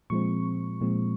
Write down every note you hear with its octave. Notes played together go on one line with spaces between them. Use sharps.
A#2 F3 G#3 C4 C#6
A#2 F3 G#3 C4